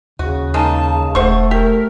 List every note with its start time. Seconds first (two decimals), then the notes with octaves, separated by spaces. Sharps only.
0.19 D#2 C#3 F#4
0.54 G#3 A#3 D#4 A5
1.15 E1 A3 C5 F#5 C#6
1.51 G4 A#4